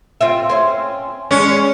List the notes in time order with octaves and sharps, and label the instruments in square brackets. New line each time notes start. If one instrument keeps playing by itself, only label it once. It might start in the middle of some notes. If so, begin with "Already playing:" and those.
[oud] C4 F4 E5
C4 C#4
[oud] G#3 D4 [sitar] C#4